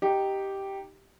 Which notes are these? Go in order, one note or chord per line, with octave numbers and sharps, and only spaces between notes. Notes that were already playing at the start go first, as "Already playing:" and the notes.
D#4 G4